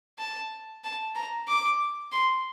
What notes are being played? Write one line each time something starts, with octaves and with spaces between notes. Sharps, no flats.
A5
A5
A#5
D6
C6